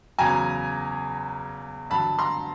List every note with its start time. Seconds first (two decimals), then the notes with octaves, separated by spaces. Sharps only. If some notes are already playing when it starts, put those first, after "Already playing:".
0.19 E2 C#3 F#3 G#5 A#5
1.90 G2 D3 F#3 A5 B5
2.19 A#5 C6